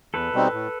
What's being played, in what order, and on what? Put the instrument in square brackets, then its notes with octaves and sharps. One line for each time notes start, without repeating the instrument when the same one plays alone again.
[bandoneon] E2 [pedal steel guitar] A4 B4
[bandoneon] B2 G3 C4 D#4
A2